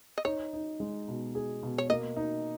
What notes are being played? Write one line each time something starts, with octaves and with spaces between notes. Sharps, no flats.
D#5
D#4 C#5
D#4
G#3
B2
G#4
B2
C#5
A#3 D#5
D#4